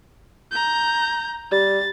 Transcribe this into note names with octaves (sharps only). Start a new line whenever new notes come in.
A#5 G6
G3 A6